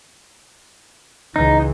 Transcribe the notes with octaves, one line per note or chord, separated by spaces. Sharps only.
C#2 E3 D#4